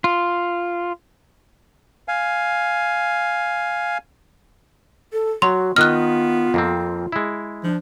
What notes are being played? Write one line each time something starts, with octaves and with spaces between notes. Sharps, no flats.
F4
F5 G#5
A4
F#3 F#4 C6
D#3 B3 F4 D#5 F6 F#6
F2 A#3 C4
G#3 E4
F3 D4